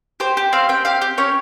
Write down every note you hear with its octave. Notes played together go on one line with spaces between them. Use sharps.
G4 C5
G4
C4 F5
C4 G5
G4 F5
G4
C#4 C#5